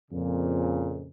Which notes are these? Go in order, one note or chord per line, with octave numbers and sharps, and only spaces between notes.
F2 A#2 C#3